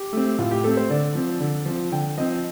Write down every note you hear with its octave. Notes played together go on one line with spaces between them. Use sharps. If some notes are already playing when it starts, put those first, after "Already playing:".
Already playing: G4
A3 C4
A2 F4
G4
A3 C4 A4
C5
D3 D5
F3 C4
D3
F3 C4
D3 G5
F3 C4 D#5